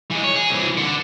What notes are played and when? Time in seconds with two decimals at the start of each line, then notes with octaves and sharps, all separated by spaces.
0.11 E3 G#3
0.24 C#5
0.35 G#4
0.50 C2 E3
0.77 D3